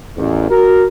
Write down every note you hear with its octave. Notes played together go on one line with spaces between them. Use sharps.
A1 E2
F#4 A#4